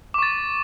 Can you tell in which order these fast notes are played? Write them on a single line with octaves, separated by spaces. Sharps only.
D6 C#6 A6